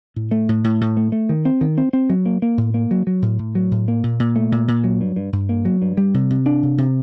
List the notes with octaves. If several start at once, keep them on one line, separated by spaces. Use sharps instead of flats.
A2
A3
A2
A2
A2
A3
A3
D#3
C4
D#3
C4
C4
F#3
A#3
A#3
A2
A#3
F#3
F#3
A2
A2
F#3
A2
A#3
A#2
A#2
A3
A#2
A#2
F#3
G2
G2
G2
A#3
F#3
G2
G3
C3
C3
D4
C3
C3